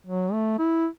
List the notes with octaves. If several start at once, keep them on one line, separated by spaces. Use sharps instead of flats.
F#3
A3
E4